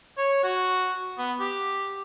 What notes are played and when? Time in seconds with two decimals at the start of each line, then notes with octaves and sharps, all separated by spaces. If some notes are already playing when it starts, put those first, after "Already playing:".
0.18 C#5
0.44 F#4
1.18 B3
1.40 G4